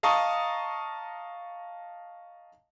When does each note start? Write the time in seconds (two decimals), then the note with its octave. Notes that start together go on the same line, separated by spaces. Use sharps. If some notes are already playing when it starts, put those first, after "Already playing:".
0.03 D#5 F5 A5 A#5 C#6 D#6